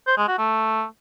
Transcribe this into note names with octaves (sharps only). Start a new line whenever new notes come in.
C5
G#3
F#4
A3